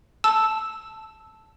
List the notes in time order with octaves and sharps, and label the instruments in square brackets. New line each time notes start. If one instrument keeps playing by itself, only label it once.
[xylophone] A5 E6